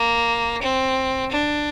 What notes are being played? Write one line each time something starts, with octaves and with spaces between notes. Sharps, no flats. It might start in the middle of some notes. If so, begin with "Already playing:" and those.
Already playing: A#3
C4
D4